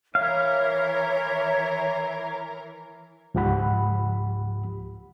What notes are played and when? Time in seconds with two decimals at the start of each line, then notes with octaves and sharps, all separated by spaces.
0.15 E3 A#4 C#5 E5 F5
3.35 C#2 G#2 F3 G4 F#5 B5